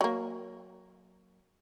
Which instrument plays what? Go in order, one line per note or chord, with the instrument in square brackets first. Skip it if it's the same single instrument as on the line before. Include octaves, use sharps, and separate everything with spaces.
[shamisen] F#3 A#3